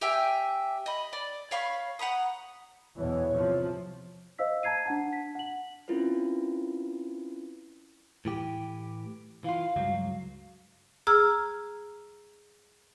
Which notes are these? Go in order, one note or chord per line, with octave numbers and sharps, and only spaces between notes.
G4 E5 G5 G#5
D#5 B5
D5
C#5 F5 B5 C#6
F#5 A#5 B5 D#6
E2 B2 E3 C#5
C3 F3
C5 D#5 F5 E6 B6
A5 A#5 G#6 C7 D#7
D4 F#5 A5
B6
F#5 F#7
C4 C#4 E4 F4 A#4 B4
A2 E3 G4
E3 F4 F5
C#2 G2 F#3
G#4 A#5 E6 F6